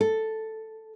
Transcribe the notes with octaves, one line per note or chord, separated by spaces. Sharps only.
A4